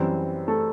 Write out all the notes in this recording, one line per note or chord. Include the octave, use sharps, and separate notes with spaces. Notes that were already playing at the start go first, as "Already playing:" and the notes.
Already playing: F#2 E3 G3 C4 C5
A3 A4